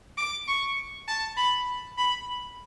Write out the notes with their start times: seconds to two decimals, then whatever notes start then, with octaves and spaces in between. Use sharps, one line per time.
0.18 D6
0.48 C#6
1.08 A5
1.37 B5
1.98 B5